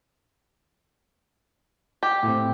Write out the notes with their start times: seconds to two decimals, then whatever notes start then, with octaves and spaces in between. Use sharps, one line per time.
2.03 G4
2.23 A2 C4